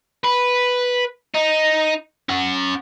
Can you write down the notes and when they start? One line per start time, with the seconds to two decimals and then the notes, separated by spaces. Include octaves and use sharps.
0.24 B4
1.34 D#4
2.29 C#4 F#5